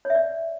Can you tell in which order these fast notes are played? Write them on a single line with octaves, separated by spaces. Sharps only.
C#5 E5 D5